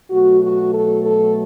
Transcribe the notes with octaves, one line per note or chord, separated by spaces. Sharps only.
B2 F#3 A3 F#4
F#4
A4
A4